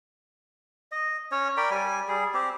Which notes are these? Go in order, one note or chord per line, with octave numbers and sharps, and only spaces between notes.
D#5
C#4 C#5
A#4 D5 G5 B5
G3 G#5
G3 G#4
C4 G4